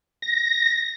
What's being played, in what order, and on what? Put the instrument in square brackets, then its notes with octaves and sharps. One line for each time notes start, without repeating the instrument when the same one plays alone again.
[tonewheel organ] A#6